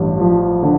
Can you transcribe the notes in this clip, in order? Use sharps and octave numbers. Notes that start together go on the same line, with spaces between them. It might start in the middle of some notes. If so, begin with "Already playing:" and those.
Already playing: A1 G2
F3
D3